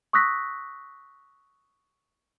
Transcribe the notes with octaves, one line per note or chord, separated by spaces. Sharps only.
C#6 D#6 E6 F#6 A#6 B6